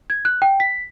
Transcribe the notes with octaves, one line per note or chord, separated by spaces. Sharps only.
G#6
F#6
G5
B6